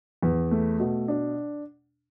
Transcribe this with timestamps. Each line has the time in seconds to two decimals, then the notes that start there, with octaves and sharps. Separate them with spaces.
0.23 E2
0.51 A3
0.79 B2
1.08 D4